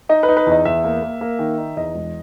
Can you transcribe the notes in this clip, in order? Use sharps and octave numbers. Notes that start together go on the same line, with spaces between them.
D#4 D#5
B4
D#4
B4
E2 D#5
E2 E5
A#3
A#3
A#3
D#3
D#4
E2 D#5
E1